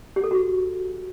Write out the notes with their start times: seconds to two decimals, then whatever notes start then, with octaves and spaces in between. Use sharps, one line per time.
0.16 G4
0.24 A4
0.31 F#4